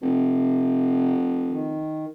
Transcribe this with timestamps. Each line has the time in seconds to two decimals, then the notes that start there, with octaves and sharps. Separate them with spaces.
0.02 F1 C3
1.49 D#3